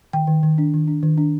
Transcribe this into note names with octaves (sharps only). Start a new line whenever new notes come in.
D#3 G5
D#3
D#3
D4
D#3
D4
D#3
D4